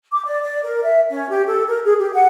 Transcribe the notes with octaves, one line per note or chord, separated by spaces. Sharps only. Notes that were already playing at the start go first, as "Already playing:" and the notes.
D6
D5
D5
A#4
E5
C#4
G4
A4
A#4
G#4
G4
F#5